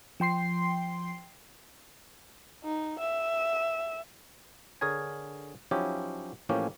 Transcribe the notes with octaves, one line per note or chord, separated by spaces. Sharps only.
F3 G5 C6 C7
D#4
E5
D3 G#4 A#4 C#5 G#5
F3 F#3 C#4 D#4 E4 G4
A2 E3 F3 A#3 C#4 G4